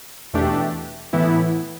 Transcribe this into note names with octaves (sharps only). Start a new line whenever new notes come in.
E2 B2 A3 D4 G4
A2 E3 B3 E4